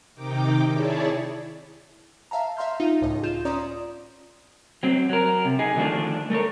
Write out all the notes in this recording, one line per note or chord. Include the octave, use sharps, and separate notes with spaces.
C3 D#3 D#4 G5 D6
E4 G#4 C#5 D5 A5
E5 F5 A5 A#5
E5 F5 A#5 C6 F6 G6
D#4 F4
C#2 A2 D#5
F4 G6 E7
C#4 D5 A#5 C6 D#6
F#3 C4
F#3 A#4
C3
D#4 G#4
D3 D#3 F3 A3 D4 F4
A3 A4 A#4 C#5